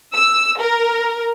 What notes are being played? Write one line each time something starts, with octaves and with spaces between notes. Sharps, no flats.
E6
A#4